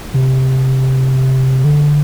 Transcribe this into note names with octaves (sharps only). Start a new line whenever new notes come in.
C3
D3